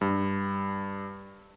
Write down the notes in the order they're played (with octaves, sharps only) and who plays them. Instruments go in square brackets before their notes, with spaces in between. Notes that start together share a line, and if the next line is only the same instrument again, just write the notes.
[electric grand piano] G2